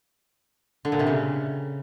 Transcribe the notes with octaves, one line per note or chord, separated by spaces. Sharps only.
D3
A#2
C3
C#3